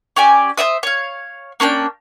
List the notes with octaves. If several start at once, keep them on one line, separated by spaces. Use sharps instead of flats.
C#4 G4 D5 G#5
C5 D5 E5 D#6
C#5 F5
A#3 C#4 D4 G5